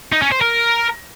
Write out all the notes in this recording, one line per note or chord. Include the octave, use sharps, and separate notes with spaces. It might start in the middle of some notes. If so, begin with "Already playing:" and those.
D#4
C#4
C5
A#4